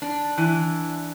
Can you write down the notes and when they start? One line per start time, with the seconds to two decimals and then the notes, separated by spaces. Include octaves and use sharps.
0.02 D4
0.38 E3